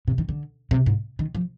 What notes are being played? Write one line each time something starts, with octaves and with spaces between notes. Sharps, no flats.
C3
D#3
D3
C3
G#2
D#3
F3